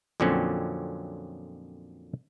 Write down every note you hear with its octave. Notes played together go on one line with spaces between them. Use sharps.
F2 A#2 D3 F#3 C4 C#4